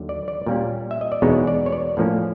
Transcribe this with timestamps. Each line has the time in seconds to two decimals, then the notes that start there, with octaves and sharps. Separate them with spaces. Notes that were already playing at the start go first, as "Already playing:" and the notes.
Already playing: D#2 D3 F#3
0.09 D5
0.28 D5
0.47 A#2 G3 A#3 C#4
0.91 E5
1.01 D#5
1.12 D5
1.22 E2 B2 G#3 B3 D#4 C#5
1.47 D5
1.66 C#5
1.72 D5
1.97 A2 F3 A#3 C#4